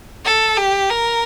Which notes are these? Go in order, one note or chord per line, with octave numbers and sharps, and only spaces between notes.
A4
G4
A#4